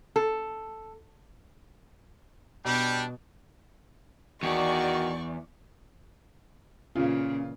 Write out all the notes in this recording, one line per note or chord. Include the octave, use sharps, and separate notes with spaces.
A4
B2 G3 D4
E2 D#3 F#4 D5 C#6
A#2 C#3 E3 C#4 F4